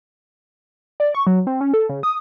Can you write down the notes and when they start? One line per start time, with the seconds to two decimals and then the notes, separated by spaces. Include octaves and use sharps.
1.00 D5
1.15 C#6
1.27 F#3
1.47 C4
1.61 C#4
1.74 A4
1.89 C#3
2.03 D#6